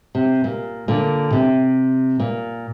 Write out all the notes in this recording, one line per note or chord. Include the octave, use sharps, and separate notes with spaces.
C3
A#2
A#2 D3
C3
A#2